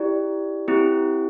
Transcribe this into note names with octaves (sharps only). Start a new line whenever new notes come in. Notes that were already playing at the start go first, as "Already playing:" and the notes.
Already playing: E4 G4 D5
C4 E4 G4